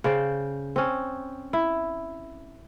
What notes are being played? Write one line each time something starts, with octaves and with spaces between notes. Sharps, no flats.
C#3 C5 D5 G5
C4 C#4
E4